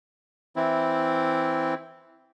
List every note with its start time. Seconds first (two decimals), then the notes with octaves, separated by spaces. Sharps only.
0.56 E3 C4 E4